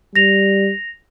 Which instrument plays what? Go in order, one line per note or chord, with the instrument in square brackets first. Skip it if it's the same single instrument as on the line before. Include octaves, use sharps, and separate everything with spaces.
[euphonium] G3 [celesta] A#6 F7